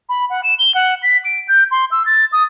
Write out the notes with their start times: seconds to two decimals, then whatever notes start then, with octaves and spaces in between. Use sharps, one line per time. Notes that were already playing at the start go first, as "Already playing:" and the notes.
0.09 B5
0.30 F#5
0.43 E7
0.59 G7
0.75 F#5
1.03 B6
1.25 D7
1.48 G6
1.71 C6
1.91 E6
2.06 A6
2.32 D#6